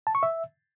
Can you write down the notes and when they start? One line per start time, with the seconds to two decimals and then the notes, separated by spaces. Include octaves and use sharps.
0.07 A5
0.15 C#6
0.23 E5